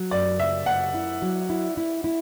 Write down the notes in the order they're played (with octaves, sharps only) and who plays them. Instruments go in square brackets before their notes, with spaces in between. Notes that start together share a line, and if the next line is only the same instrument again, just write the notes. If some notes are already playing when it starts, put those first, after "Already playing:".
Already playing: [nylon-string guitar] F#3
[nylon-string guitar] F#2 [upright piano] D5
[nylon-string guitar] C#3 [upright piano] E5
[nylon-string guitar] F#2 [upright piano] F#5
[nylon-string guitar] E4
F#3
E4
E4
E4